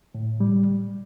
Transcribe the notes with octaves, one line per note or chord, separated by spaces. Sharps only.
A2
G3